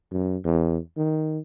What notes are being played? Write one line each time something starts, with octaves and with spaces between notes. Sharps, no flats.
F#2
E2
D#3